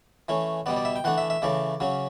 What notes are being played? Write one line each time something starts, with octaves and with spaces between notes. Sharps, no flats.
E3 A3 C#4
B2 G3 B3 D5
D5
E5
G5
E3 A3 D4 F#5
E5
E5
C#3 E3 A3 D5
C#3 F#3 C#4